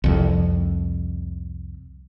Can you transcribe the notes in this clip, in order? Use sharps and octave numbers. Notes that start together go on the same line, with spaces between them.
C2 F2